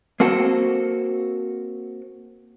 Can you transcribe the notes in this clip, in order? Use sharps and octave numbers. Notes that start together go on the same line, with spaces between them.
A#3 C4 F#4 A4